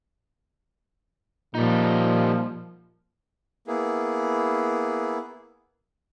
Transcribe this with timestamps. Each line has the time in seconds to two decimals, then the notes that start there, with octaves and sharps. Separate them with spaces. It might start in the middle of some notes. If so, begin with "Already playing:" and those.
1.55 A#2 F3 G3 D#4
3.67 A#3 B3 E4 G#4